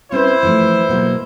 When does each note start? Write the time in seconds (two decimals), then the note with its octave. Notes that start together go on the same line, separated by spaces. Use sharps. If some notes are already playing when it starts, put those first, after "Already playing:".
0.12 C4 C#4 E4 B4 C5
0.43 E3 F3 A3
0.89 B2 F#3 A#3